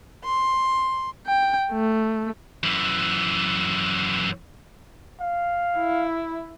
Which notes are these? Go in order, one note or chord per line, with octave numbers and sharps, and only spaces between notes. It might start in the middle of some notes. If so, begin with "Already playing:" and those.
C6
G5
A3
F#2 E3
F5
E4